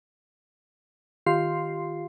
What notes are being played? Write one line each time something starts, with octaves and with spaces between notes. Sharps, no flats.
D#3 F4 G4 F5 C6 C7